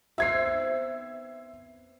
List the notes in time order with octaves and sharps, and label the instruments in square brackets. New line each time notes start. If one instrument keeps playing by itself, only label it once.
[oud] B3 C4 D#4 [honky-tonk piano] E5 G#6 C7